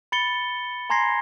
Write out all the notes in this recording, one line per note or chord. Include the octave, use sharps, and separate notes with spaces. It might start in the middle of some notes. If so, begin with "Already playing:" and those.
B5 A6 C#7 G7
G#5 A#5 C6 G#6 A#6 C7